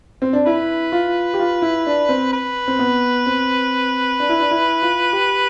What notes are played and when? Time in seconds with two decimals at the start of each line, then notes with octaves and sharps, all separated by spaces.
0.22 C4
0.33 D4
0.46 E4 B4
0.92 F4
1.34 G4
1.39 F4
1.62 E4
1.86 D4
2.09 C4
2.33 B4
2.68 C4
2.79 B3
3.26 C4
4.20 D4
4.29 E4
4.40 D4
4.51 E4
4.82 F4
5.13 G4